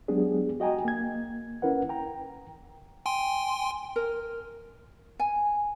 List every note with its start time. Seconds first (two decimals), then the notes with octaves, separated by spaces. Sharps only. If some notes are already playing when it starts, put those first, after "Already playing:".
0.08 F#3 G#3 B3 D4 G4 G#4
0.60 F#4 D#5 G5 G#5 A#5
0.85 A#3 G#6
1.62 C#4 E4 A#4 B4 F#5
1.89 G5 A#5
3.06 G5 G#5 C6
3.96 A#4
5.19 G#5